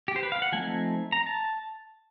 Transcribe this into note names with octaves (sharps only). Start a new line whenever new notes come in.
G4
C5
B4
F5
F#5
F3 A3 C4 D#4 G#5
A#5
A5